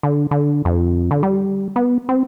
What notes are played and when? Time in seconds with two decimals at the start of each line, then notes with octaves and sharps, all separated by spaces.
0.03 D3
0.31 D3
0.65 F2
1.11 D3
1.23 G3
1.76 B3
2.09 C4